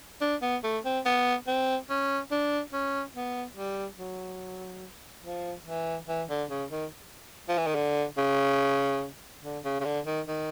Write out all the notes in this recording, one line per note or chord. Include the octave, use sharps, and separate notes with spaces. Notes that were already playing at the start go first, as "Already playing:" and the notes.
D4
B3
A3
C4
B3
C4
C#4
D4
C#4
B3
G3
F#3
F3
E3
E3
D3
C#3
D#3
F3
E3
D#3
D3
C#3
D3
C#3
C#3
D3
D#3
D#3